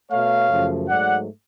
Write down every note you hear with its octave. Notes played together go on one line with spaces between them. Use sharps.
B2 A3 C#5 F5
F#2 C#3 F3 A3
G#2 F#3 A3 D5 F#5